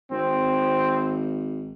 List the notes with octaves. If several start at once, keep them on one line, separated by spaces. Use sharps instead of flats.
G#1 C4